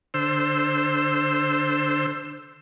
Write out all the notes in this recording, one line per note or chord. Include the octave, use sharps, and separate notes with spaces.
D3 C5 E6